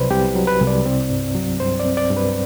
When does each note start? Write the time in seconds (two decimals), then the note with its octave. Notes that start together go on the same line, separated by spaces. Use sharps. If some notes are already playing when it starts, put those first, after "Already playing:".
Already playing: C2 C3 F#3 B4 C5 D5
0.10 C2 G4
0.35 F#3
0.47 B4
0.60 C2
0.67 D5
0.86 C4
1.10 G2
1.35 F#3
1.60 G2 C5
1.80 D5
1.85 C4
1.97 D5
2.10 G2
2.17 B4